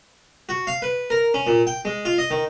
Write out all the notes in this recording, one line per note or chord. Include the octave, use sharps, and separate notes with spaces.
F#4
F5
B4
A#4
C#4
A#2
G5
G#3
F4
D#5
D#3